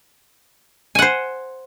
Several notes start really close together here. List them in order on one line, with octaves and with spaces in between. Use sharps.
G#5 F#5 C5